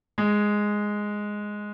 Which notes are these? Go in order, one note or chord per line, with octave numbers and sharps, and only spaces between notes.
G#3